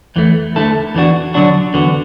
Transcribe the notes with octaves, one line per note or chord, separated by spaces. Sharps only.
E2 E3 A3
D2 D3 A3 E4 A4
E2 E3 D4 F#4
D3 F#3 D4 F#4
E2 D3 B3 F#4